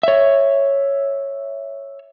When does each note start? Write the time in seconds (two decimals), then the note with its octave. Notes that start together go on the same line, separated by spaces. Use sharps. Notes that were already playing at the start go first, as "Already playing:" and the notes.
0.03 C#5 E5